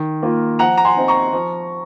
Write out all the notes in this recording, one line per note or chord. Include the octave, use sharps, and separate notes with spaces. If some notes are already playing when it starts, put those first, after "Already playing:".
Already playing: D#3
A#3 F4
F3 F#5 A#5
A#5
G#5 C6
C4 D#4
A#5 C#6
F3